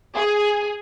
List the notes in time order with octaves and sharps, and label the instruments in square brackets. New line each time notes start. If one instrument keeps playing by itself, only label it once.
[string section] G#4